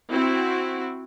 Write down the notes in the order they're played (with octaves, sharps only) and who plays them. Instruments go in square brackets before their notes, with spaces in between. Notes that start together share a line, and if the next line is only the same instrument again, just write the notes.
[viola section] C4 E4 F#4